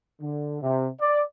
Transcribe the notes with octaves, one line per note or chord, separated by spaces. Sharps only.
D3
C3
D5